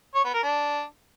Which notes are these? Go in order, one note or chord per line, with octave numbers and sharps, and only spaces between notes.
C#5
B3
A#4
D4